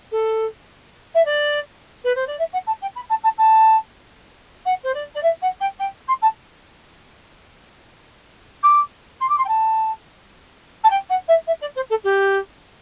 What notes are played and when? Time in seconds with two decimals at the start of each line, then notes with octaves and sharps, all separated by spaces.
0.11 A4
1.14 E5
1.25 D5
2.04 B4
2.15 C5
2.27 D5
2.39 E5
2.53 F#5
2.67 A5
2.81 G5
2.95 B5
3.09 A5
3.23 A5
3.38 A5
4.65 F#5
4.83 C5
4.94 D5
5.14 D5
5.23 E5
5.42 F#5
5.60 G5
5.79 G5
6.08 C6
6.22 A5
8.63 D6
9.20 C6
9.29 D6
9.38 C6
9.44 G5
9.48 A5
10.83 A5
10.90 G5
11.09 F#5
11.28 E5
11.47 E5
11.61 D5
11.75 C5
11.90 A4
12.03 G4